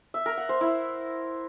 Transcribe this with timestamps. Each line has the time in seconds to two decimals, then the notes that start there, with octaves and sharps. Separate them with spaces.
0.14 E5
0.26 A#4
0.37 F#5
0.49 C5
0.61 E4